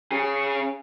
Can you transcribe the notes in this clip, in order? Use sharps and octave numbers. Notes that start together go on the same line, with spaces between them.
C#4 G#4